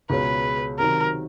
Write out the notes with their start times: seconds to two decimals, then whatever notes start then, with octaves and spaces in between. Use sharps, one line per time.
0.10 C#2 B2 G#3 C#4 B4
0.79 C3 D#3 F#3 A#4